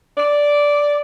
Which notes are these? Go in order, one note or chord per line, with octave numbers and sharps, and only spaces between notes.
D5